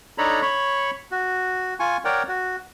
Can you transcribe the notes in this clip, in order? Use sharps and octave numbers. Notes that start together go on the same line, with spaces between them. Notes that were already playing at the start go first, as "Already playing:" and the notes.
D4 D#4 A4 C#5 A#5 B5
C#5 B5 C#6
F#4
F4 G#5 C#6
A#4 C#5 D5 F#5 G5
F#4